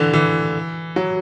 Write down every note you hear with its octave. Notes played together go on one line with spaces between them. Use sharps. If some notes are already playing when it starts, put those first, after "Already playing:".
Already playing: D3 E3
E3
F#3